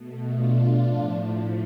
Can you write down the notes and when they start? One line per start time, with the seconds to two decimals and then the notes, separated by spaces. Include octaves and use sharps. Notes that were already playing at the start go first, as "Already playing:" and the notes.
Already playing: B2 A3
0.34 D4 F4
0.83 A2 F3 A3